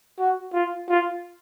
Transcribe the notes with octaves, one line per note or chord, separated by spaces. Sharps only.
F#4
F4
F4